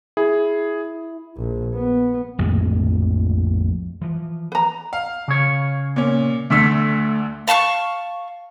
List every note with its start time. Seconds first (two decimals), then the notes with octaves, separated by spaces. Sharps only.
0.17 E4 G#4
1.37 A#1
1.74 B3
2.39 A#1 F2 A2 G#3
4.02 E3 F3
4.52 B4 A#5
4.93 F5
5.28 C#3 C#5
5.96 A#2 C#4
6.50 D2 D3 A3 E6
7.48 F5 A5 C6 C#6